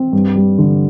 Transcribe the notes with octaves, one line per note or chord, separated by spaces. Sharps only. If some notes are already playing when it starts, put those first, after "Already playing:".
Already playing: C4
G2
G3
D3